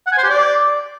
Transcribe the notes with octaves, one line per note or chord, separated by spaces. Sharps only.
F#5
G#5
C5
G4
D5